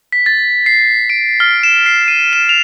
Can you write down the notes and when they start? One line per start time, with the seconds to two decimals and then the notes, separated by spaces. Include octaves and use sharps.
0.12 B6
0.26 A6
0.66 C7
1.10 D7
1.40 F6
1.63 E7
1.86 C7
2.08 D#7
2.33 E7
2.49 F7